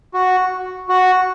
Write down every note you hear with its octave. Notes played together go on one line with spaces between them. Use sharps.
F#4
F#4